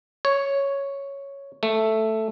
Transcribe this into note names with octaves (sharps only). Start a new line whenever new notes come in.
C#5
A3